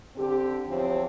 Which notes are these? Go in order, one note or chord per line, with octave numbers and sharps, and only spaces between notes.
D3 C4 G4
E2 F3 C4 C#5